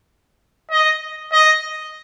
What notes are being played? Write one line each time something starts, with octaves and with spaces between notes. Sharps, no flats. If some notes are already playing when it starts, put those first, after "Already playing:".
D#5
D#5